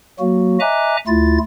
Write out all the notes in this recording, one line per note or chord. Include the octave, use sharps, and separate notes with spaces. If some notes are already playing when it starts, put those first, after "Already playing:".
F#3 A#3 F#4
D#5 E5 G#5 A#5 D6 F#6
D2 A3 E4 F4 A6